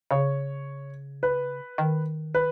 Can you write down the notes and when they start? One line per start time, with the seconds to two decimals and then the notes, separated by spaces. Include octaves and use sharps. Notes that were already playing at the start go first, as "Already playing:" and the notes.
0.11 C#3 C#5
1.23 B4
1.78 D#3
2.34 B4